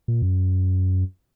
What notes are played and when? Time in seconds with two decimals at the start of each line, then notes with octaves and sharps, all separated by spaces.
0.08 A#2
0.22 F#2